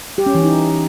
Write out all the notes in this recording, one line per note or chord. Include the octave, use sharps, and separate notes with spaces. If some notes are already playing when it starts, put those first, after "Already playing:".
G4
C#4
E3
D#4